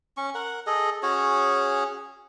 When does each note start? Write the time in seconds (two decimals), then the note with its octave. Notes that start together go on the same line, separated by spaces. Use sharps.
0.17 C#4 C#6
0.35 A#4 F#5
0.67 G#4 A4 D#5
1.03 C#4 F#4 G#4 C#5